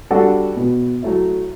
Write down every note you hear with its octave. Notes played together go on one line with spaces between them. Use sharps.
G3 D4 F#4 A4
B2
F#3 A3 E4